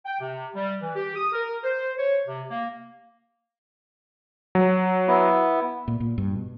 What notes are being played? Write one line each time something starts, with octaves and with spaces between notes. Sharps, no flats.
G5
C3
G3
E3
G4
D#6
A#4
C5
C#5
C3
A#3
F#3
B3 E4
A#2
A#2
G2
B2